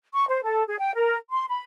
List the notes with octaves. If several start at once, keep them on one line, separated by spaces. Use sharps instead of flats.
C#6
C5
A4
G#4
G5
A#4
C6
B5